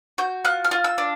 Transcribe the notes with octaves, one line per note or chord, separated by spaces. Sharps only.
F#4 G6
F4 F#6
F6
F4
E6
D4